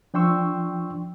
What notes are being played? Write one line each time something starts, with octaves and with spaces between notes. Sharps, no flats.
F3 D4 G5 C6 C#6 E6